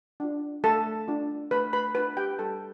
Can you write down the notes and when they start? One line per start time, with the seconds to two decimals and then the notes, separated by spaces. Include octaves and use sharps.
0.20 D4 F4
0.64 A3 A4 A5
1.08 D4 F4
1.51 A3 B4 B5
1.73 B4 B5
1.95 D4 F4 B4 B5
2.17 G4 G5
2.39 G3 A4 A5